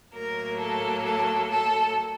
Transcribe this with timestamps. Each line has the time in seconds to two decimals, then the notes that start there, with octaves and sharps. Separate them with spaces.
0.15 A2 F#3 A#3 A#4
0.59 A4
1.05 A4
1.50 A4